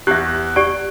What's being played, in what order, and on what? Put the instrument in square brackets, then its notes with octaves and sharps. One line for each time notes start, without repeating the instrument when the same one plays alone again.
[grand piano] E2 F#6 [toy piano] G4 E5
[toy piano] G4 D5 C#6 [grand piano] D7